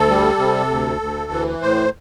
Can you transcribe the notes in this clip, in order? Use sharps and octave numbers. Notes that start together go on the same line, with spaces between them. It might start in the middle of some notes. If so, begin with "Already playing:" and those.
Already playing: D2 A4
G3
C3
D2
D2
E3
A2 C5